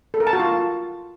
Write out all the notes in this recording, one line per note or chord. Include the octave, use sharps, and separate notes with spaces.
A4
A#4
A5
F#4
F4